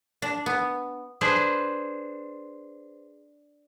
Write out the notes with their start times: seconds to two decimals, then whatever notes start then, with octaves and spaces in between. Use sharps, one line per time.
0.22 D4
0.46 B3
1.21 D4 G#4 B4 C5